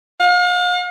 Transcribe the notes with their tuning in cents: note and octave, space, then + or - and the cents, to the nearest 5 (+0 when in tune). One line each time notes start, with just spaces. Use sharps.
F5 +40